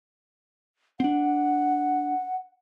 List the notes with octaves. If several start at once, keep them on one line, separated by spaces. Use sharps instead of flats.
C4 D4 F#5